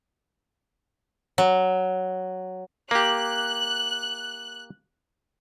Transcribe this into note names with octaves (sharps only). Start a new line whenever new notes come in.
F#3
A#3 G4 F#6